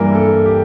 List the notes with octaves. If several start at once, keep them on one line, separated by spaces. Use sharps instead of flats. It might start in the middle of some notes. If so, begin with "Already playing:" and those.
Already playing: G2 E3 G3 A#3 E4 A#4
A4
G4